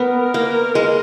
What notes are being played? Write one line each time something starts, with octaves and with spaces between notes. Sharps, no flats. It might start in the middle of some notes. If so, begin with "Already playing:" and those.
Already playing: B3 A#4
A#3
G#3